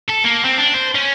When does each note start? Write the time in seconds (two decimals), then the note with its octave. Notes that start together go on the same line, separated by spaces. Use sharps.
0.09 A4
0.25 A#3
0.45 C4
0.58 D4
0.74 C5
0.95 C#4